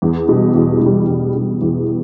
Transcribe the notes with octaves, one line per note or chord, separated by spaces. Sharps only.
E2
B2 G3
E2
B2 G3
E2
B2 G3
E2